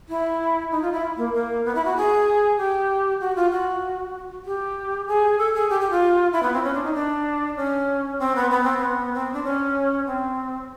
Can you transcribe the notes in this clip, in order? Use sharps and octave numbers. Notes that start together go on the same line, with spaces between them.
E4
D#4
F4
E4
A#3
A#3
B3
E4
F#4
G#4
G4
F#4
F4
F#4
G4
G#4
A4
G#4
G4
G4
F4
E4
B3
C4
C#4
D4
D#4
D4
C#4
C4
B3
B3
C4
B3
C4
D4
C#4
C4